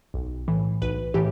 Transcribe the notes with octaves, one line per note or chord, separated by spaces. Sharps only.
B1
A2 E3
B1 B4
A2 E3 G4